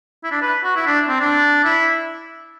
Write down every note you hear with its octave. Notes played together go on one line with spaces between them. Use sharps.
E4
D4
B4
F#4
E4
D4
C4
D4
E4